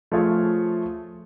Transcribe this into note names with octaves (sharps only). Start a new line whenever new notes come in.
F3 A3 F4 G#4 C#5